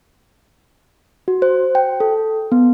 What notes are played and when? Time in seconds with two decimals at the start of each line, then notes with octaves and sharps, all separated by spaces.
1.28 F#4
1.42 C5
1.75 G5
2.00 A4
2.52 B3